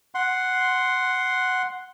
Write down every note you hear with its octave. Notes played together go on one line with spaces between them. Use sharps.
F#5 C6